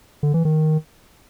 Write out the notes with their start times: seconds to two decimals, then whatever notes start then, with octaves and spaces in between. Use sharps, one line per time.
0.23 D3
0.34 E3
0.45 D#3